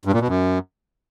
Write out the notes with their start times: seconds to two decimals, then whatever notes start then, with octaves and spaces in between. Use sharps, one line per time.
0.05 G2
0.13 A#2
0.20 B2
0.28 F#2